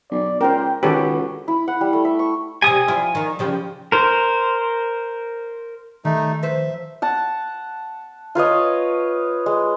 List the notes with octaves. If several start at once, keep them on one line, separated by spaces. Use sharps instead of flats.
B1 D5
C#2 A#4 C5 G5
C#2 D#3 F#4 G4 A4 B4 C#5
E4
F#5
G3
A3
E5
C#6
C3 G4 G#5 D#6
F3 E4 F4
D#3 D#4
C#3 F3 G4
A#4 C5
D#3 G3 A3 D#4
F3 B4 C5 E5
F#5 A5
F4 B4 C#5 D#5
G#3